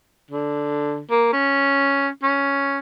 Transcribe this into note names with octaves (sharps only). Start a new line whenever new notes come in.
D3
A#3
C#4
C#4